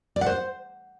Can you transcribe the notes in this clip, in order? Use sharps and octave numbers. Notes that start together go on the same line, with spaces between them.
D5
F#5
C5